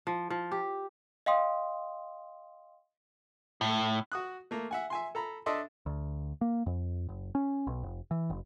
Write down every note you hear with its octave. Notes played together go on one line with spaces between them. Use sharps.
F3
F3
G4
D#5 F5 G5 C6 D#6
A2
F#4 D#6 F#6
A3 A#3
E5 F#5 G#5
E5 G#5 C6
A4 A#5 B5
D4 A4 D#5 E5 C6
D2
A#3
F2
F#1
C#4
B1
F1
E3
F#1